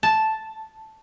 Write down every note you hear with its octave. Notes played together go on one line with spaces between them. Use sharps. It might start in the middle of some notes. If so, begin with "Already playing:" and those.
A5